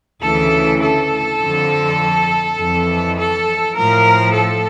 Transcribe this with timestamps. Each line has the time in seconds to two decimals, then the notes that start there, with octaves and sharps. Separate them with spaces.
0.22 D2 C#3 E3 A4
0.82 A4
1.40 F2 D3 F3
2.58 F2 E3
3.18 A4
3.76 A2 F3 A#4
4.35 A4